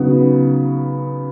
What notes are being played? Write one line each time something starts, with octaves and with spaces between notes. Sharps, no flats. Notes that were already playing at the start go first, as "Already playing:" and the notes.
Already playing: C#3 F#3 B3 D#4